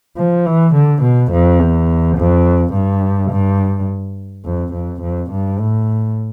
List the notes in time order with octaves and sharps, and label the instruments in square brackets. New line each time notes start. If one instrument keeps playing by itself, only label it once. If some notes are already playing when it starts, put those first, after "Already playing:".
[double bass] F3
E3
D3
B2
F2
E2
F2
G2
G2
F2
F2
F2
G2
A2